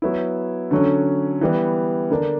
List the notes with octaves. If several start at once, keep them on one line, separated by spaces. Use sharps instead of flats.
F#3 B3 E4
D3 F#3 C#4
E3 G3 B3
D3 A#3 D4